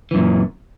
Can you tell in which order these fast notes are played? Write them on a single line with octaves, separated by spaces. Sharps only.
E3 F#2 A#2